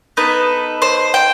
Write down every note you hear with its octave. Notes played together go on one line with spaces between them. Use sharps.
B3 D#4 A4 B4
C5
G5